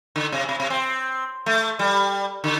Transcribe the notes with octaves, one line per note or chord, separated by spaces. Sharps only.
D3
C3
C3
C3
C4
A3
G3
D3